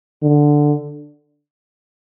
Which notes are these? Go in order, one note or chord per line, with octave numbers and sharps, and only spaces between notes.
D3